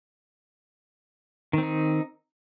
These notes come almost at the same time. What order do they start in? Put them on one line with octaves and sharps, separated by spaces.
D#3 C4 D#4